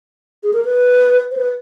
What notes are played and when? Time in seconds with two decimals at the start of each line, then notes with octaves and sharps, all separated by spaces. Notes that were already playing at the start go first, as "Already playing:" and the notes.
0.43 G#4
0.53 A#4
0.65 B4
1.31 C5
1.37 B4